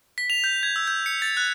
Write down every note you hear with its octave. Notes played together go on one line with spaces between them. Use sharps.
B6
F7
G6
G#6
E6
G6
C#7
A6
F#6